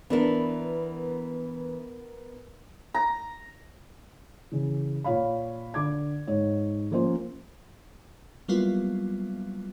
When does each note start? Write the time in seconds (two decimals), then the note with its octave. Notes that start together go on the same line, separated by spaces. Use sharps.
0.10 E3 B3 D4 E4 A#4
2.94 A#5
4.52 C#3 E3
5.04 A#2 F4 C#5 F5 B5
5.74 D3 D6 G#6
6.27 G#2 C#5
6.91 F3 A#3 C#4 F4 C5
8.48 F#3 G3 A#3 B3 E4 F4